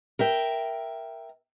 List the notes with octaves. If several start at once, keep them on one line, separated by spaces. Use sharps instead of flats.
A#4 E5 G5